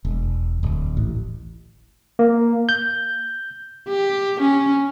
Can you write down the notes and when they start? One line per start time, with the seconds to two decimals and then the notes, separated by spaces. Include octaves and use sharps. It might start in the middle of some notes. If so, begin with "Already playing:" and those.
0.05 E1
0.63 D1
0.97 A1
2.19 A#3
2.69 G6
3.88 G4
4.41 C#4